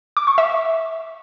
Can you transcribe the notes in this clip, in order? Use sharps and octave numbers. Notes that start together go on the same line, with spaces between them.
D6
C#6
E5